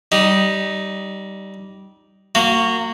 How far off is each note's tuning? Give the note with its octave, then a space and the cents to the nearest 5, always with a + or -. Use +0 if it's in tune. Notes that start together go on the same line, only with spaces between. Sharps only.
G3 -15 D#4 +0
A#3 -25 F#4 +0